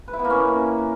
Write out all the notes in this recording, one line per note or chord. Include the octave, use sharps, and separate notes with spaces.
B4
E4
B3
A#3
C#4